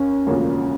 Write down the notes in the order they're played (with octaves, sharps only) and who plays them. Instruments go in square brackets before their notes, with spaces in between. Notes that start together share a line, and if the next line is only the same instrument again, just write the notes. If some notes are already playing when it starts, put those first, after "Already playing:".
Already playing: [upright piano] D#2 [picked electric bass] C#4
[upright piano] E1 D2 C#3 F3 A#3